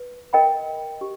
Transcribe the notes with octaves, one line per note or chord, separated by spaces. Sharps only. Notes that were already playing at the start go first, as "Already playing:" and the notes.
Already playing: B4
A#4 D#5 G5 B5
G4